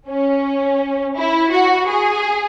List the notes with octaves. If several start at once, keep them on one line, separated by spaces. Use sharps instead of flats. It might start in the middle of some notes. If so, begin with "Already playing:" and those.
C#4
E4
F#4
G#4